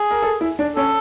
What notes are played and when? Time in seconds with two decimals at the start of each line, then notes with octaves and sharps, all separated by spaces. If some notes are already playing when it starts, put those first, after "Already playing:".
Already playing: G#4
0.11 A#4
0.22 A4
0.41 E4
0.59 D4
0.76 C#4 A4